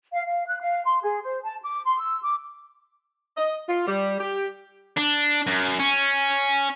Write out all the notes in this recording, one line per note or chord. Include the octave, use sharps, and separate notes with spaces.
F5
F5
F#6
F5
C6
G#4
C5
A5
D6
C6
E6
D6
D#5
F4
G3
G4
D4
F#2
C#4